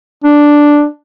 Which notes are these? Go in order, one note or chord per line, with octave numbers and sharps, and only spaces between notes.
D4